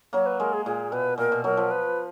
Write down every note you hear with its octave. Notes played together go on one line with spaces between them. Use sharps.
F#3 A#3 C#5
B4
G#3 A#4
G#4
A#2 G#4
B2 B4
A#2 A#4
B2
F#3 A#4
F3
B4